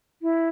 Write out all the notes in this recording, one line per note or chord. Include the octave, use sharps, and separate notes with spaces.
E4